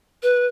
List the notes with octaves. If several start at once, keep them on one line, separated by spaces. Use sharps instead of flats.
B4